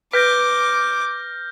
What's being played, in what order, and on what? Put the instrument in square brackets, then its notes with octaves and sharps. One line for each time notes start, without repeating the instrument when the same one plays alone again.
[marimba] B4 [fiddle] D6 [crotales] F6 G6 A#6